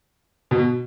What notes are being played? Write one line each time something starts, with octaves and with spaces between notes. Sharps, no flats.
B2